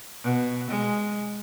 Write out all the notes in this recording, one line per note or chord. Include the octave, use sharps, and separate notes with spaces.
B2
G#3